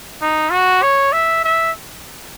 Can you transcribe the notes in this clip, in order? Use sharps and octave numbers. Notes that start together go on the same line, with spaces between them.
D#4
F#4
C#5
E5
E5